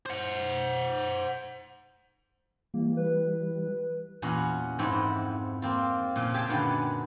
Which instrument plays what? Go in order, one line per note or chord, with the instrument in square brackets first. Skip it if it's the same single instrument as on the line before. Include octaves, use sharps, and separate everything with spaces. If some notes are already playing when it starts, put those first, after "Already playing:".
[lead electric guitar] C5 F#5
[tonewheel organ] E3 G3 [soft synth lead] A#3
[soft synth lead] B4
[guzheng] E2 A#2 C#4 F#4 B5
F2 G#2 B3 C4 E4 B5
A#3 C4 F4
A#2 C#3 F3
G4 G#4 E5 F5 G5 A5
F#2 A#2 D3 D#3 F#3 B3